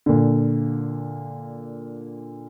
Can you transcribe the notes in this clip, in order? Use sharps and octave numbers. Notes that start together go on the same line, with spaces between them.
A#2 D3